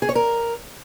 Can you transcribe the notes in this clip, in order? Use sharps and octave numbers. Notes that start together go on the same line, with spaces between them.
G#4
C#5
A#4